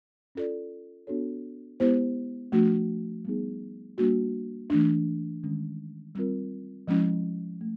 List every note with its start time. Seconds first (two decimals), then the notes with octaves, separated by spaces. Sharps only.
0.35 C#4 F4 A4 D5
1.07 B3 D4 F#4 A4 C#5
1.80 G#3 B3 E4 G4 C5
2.52 F3 A3 D4 F#4
3.25 G3 B3 D#4 G#4
3.98 G3 A#3 D4 F#4
4.70 E3 A3 D4
5.43 D#3 G#3 C#4
6.15 G3 C4 F4 A#4
6.87 F3 G#3 C#4 E4
7.61 A3